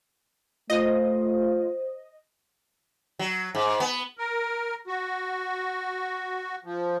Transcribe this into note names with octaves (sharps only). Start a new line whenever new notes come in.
A3 F4 C5 D#5
F#3
G#2
B3
A#4
F#4
F3